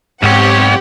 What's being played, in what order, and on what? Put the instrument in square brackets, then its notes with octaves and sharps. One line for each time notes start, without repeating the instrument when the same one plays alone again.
[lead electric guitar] B1 C#5 [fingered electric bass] G#2 [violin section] C4 G4 F#5